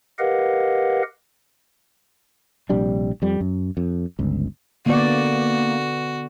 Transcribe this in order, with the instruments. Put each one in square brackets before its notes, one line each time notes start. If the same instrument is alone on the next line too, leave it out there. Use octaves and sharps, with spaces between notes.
[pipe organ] G4 A#4 B4 D#5 F5 F#5
[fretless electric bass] A#1 C3 G3 D4
F2 G3
F#2
F2
G1 C#2
[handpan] D3 B3 D5 [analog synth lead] A#3 [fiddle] F#4